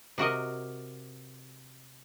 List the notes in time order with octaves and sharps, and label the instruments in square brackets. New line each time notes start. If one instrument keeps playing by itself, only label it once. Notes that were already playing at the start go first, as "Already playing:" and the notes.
[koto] C3 F#4 A#4 D#5